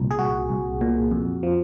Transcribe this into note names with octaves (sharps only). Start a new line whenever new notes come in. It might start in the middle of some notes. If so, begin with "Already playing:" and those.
Already playing: C2 A#2
G#4
C2 F#4
C2
A#2
F2
F3